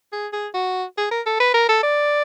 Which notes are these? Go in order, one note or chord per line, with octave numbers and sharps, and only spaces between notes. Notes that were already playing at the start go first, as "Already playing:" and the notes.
G#4
G#4
F#4
G#4
A#4
A4
B4
A#4
A4
D5